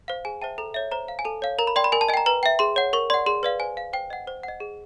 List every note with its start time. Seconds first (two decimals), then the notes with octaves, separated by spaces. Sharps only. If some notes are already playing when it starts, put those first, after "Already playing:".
0.08 C5 F5
0.25 G#4 G#5
0.42 C5 E5 G5 A5
0.58 A4 A#5
0.74 C#5 E5
0.91 C5 A#5
1.08 F5
1.19 G#5
1.25 A4 A5
1.42 C#5 F5
1.59 A#4 A#5
1.67 B5
1.76 D5 G5 C6
1.84 B5
1.92 A#4 G#5
2.01 A5
2.09 D#5 G#5
2.14 G5 A#5
2.26 B4 A#5
2.43 E5 G5
2.59 G#4 C6
2.76 C#5 F#5
2.93 A#4 C#6
3.10 D5 F#5 C6
3.26 G#4 C6
3.43 B4 D5 F5
3.59 C5 G#5
3.77 F5
3.93 C5 G5
4.10 D#5 F#5
4.27 C5
4.43 D#5 F#5
4.60 G#4